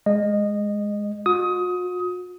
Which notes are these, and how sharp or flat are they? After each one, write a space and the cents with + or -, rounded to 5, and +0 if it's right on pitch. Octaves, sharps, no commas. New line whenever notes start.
G#3 +0 D#5 -15
F#4 -45 D#6 +20